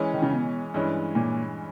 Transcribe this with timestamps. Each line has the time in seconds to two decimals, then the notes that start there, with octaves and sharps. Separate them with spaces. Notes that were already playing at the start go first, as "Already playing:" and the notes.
Already playing: E3 G#3 C#4 G#4
0.13 D#3
0.22 C#3
0.33 B2
0.74 G2 E3 G#3 C#4
1.15 A#2